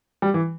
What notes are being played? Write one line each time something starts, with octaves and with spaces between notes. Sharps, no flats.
G3
E3